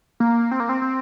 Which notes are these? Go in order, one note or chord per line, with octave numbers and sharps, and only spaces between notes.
A#3
C4
A#3
C4
C4